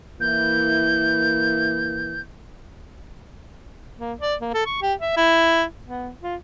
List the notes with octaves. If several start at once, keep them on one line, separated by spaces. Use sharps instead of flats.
E3 A#3 E4 G6
A#3
D5
A#3
A4
C#6
G4
E5
E4
B3
F4